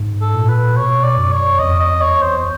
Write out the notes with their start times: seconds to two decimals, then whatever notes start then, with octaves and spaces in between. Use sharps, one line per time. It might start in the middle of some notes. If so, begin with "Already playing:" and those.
Already playing: G#2
0.21 A4
0.35 A#2
0.49 B4
0.76 B2 C#5
1.03 D5
1.18 F#2
1.32 C#5
1.59 F2 D#5
1.80 D#5
2.01 E2 C#5
2.22 C5